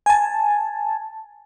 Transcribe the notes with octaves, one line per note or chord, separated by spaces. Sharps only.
G#5 A5